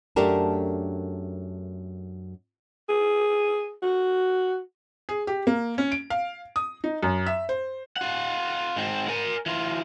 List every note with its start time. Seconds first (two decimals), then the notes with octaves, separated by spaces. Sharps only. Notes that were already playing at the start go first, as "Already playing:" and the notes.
0.16 F#2 A3 D4 G4 A#4 A5
2.89 G#4
3.82 F#4
5.09 G#4
5.27 G4
5.47 A#3
5.78 C#4
5.92 D7
6.10 F5
6.56 D#6
6.84 D#4
7.03 F#2
7.26 E5
7.49 C5
7.96 F4 F#5
8.76 G#2 C4
9.08 A#4 G#5
9.46 E3 F4